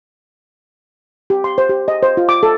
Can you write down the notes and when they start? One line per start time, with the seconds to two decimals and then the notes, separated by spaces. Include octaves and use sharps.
1.30 G4
1.44 C6
1.58 C5
1.69 G4
1.88 D#5
2.03 C5
2.17 F4
2.29 D6
2.43 A4